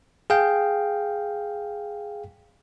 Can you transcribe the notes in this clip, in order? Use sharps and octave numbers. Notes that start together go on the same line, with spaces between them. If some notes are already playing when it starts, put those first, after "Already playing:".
G#4 F5 G5